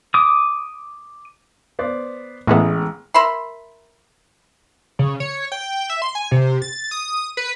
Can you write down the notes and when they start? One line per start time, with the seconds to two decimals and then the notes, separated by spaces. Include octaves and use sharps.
0.14 D6 D#6
1.79 B3 C5 D5
2.47 A1 A2 G#3 B3 G#4
3.14 A#4 E5 B5 C6
4.99 C#3
5.20 C#5
5.52 G5
5.90 E5
6.02 C6
6.15 G#5
6.31 C3
6.62 A6
6.91 D#6
7.37 B4